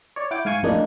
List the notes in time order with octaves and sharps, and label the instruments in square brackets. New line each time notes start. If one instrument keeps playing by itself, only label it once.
[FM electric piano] C#5 D5
E4 F#5 G5 D6
G#2 F5 G#5 C#6
F2 A2 G#3 A#3 D4 D#4